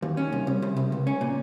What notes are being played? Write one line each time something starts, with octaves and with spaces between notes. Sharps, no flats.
D#2
C#4
C2
C2
C2
C2
C#2
C#4
A#2